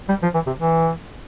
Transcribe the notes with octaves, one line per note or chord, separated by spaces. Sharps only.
G3
F3
E3
C3
E3